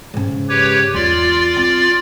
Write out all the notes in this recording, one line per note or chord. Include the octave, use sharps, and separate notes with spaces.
G#2 C#3
G4 B4 C#5
E2 F4 D5
C4